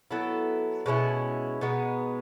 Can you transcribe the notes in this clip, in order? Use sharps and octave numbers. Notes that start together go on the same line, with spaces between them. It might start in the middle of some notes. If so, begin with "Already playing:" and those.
F#3 B3 E4 A4
B2 G#3 C#4 E4
B2 G#3 B3 D#4